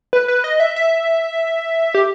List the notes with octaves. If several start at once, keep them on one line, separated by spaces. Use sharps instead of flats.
B4
B4
D#5
E5
E5
G4